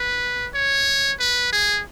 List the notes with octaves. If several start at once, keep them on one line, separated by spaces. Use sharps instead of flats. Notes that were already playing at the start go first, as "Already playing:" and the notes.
Already playing: B4
C#5
B4
G#4